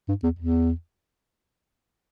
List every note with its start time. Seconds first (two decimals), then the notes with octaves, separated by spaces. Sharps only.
0.08 G2
0.23 E2
0.39 E2